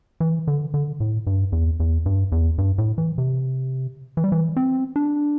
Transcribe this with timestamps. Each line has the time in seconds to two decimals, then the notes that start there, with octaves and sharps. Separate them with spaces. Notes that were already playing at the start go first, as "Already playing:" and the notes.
0.20 E3
0.47 D3
0.74 D3
1.00 A2
1.27 G2
1.52 E2
1.80 E2
2.06 G2
2.32 E2
2.58 G2
2.78 A2
2.98 E3
3.18 C3
4.17 E3
4.24 G3
4.32 E3
4.57 C4
4.96 D4